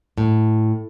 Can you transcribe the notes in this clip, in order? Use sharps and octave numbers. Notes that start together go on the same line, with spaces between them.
A2